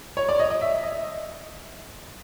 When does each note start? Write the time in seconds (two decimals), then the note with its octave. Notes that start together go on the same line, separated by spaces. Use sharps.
0.17 C#5
0.29 D5
0.40 D#5
0.50 D#5
0.61 E5
0.83 D#5